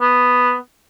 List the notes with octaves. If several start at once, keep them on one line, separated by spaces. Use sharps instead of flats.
B3